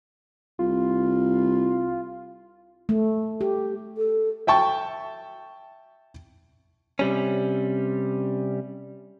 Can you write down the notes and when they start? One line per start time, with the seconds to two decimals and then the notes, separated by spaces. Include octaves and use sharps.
0.59 C2 F4
2.89 A3
3.41 G4
3.97 A4
4.47 E5 G5 A5 C#6
6.99 C3 G3 C#4